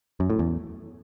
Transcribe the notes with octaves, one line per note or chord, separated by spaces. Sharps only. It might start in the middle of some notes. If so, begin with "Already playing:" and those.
F#2
A2
E2